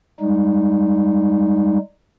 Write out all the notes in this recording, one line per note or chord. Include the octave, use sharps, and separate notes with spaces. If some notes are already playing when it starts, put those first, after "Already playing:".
G3 G#3 D#4